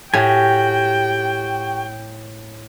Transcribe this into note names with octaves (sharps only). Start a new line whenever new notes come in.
A2 F#4 G4 G5 G#5